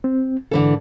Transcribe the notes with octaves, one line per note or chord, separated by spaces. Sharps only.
C4
G#2 D3 E3 A4